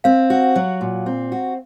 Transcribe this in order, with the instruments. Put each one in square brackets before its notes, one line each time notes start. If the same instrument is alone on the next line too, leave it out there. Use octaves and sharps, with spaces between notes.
[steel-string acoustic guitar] C4 [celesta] F5
[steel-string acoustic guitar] F#4
F#3
A#2
C4
F#4